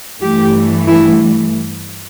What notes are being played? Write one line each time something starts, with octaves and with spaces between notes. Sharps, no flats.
G2 E3 A3 G4
E4